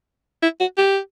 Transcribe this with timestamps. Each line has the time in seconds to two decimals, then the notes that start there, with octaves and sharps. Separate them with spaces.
0.42 E4
0.60 F#4
0.77 G4